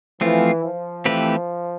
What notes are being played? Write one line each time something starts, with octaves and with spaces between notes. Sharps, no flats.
E3 F3 A3 C4 F4
F3
E3 A3 C4 G4 B4